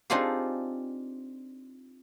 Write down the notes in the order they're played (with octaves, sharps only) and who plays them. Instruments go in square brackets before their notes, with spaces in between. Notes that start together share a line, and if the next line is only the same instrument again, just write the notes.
[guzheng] C4 D4 D#4 F4 G4 G#4